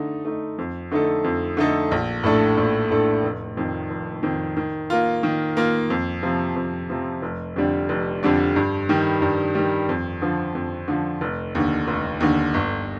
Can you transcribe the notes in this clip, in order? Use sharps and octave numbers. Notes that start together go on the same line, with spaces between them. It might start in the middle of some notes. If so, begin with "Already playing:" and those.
Already playing: D3 A3 D#4
A3 D#4
F2
D3 A3 D#4 A4
F2
D3 A3 D#4 A4
A#1
A2 A3 D4 A4
A#1
A2 A3 D4 A4
F1
F2 D#3
F1
F2 D#3
D#3
A#3 F4
D#3
A#3 F4
F2
C3 F3
F2
C3 F3
F1
F2 D3 G3 D4
F1
F2 D3 G3 D4
G2
D#3 G3
G2
D#3 G3
F2
D3 F3
F2
D3 F3
F1
D#2 D3
F1
D#2 D3
G1